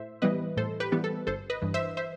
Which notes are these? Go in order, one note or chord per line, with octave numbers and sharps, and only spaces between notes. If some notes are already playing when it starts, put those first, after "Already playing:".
Already playing: A2 C5 E5
E3 G3 B3 B4 D#5
A2 A4 C5
G4 B4
E3 G3 B3
A4
G1 A4 C5
B4 D#5
G2 E3
C5 E5
C5 E5